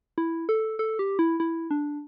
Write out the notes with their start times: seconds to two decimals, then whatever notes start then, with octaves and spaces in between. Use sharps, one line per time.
0.18 E4
0.49 A4
0.79 A4
0.99 G4
1.19 E4
1.40 E4
1.71 D4